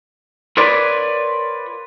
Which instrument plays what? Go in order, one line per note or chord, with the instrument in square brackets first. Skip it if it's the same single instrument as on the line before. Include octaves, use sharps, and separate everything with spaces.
[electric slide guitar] F4 A#4 B4 C#5 D5